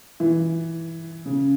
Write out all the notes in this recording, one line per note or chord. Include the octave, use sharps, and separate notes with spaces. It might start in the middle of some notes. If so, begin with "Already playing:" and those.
E3
C#3